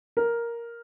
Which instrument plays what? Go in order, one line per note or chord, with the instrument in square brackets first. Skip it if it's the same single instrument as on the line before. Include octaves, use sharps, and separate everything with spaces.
[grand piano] A#4